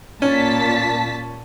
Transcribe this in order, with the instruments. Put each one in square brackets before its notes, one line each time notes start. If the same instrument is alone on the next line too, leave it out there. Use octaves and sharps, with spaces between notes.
[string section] A#2 A5 B6 [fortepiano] C#4